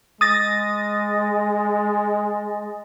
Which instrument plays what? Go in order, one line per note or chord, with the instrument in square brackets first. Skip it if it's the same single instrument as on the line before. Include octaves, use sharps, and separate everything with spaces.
[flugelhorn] G#3 [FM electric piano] D#6 A6 A#6